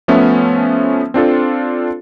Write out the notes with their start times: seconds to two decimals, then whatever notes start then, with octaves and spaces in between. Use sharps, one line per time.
0.08 F3 A3 B3 C#4 E5
1.14 C4 D4 F4 A4